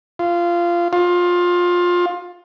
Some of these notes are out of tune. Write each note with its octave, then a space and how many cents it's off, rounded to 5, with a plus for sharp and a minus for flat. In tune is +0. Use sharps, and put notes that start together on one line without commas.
F4 -15
F4 +20